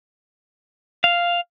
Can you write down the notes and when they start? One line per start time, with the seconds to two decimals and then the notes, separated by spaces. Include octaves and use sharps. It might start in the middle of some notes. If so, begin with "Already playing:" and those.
1.04 F5